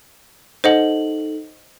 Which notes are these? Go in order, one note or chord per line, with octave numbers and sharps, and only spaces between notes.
D#4 A4 C5 D#5 F#5 F#7